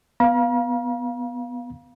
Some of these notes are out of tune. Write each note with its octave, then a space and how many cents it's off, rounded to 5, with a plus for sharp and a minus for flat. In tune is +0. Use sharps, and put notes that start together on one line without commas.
B3 +0 F5 +5 A#5 +45